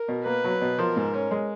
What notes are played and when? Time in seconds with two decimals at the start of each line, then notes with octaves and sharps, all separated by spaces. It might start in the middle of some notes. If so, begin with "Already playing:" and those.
Already playing: A#4
0.08 B2
0.25 A#3 B4
0.44 F#3
0.61 B2
0.78 F3 A#4
0.97 G#2
1.14 C#4
1.31 G#3